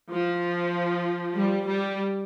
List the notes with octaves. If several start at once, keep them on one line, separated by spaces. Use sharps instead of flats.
F3
G3
G3